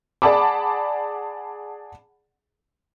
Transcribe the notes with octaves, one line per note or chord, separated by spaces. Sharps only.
G#4 D5 F#5 A5 B5 D6